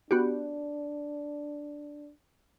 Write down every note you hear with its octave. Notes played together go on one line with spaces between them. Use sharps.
B3 D4 F#4 G4